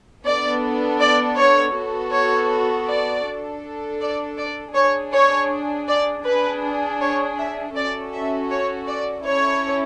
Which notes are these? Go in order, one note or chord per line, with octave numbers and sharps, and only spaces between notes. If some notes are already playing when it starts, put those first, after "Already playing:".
B3 D4 A4 D5
D5
C#5
B3 F#4 A4
C#5
D5
D4 A4
D5
D5
D4 G#4 C#5
C#5
D5
D4 G#4 B4
C#5
E5
C#4 F#4 A4 D5
E5
C#5
D5
C#4 E4 A4 C#5